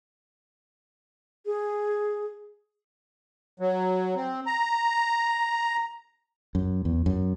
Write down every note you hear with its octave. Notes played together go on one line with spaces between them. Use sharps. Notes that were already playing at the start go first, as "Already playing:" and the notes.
G#4
F#3
C4
A#5
F#2
E2
F#2